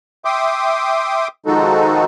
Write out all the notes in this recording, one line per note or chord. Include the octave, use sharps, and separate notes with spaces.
E5 G5 C6 D6 D#6
D#3 F3 G#3 D#4 F#4 A4